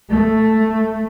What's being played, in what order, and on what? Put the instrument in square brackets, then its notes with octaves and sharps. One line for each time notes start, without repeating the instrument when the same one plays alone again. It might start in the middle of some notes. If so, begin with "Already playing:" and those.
[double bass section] A3